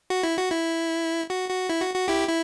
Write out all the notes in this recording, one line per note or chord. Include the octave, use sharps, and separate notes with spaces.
F#4
E4
F#4
E4
F#4
F#4
E4
F#4
F#4
E4 G4
E4